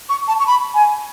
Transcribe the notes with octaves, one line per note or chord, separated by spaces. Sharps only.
C#6
A5
C#6
B5
G#5